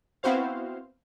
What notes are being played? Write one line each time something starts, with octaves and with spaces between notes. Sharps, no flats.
B3 C4 E4 F#4 C5 F5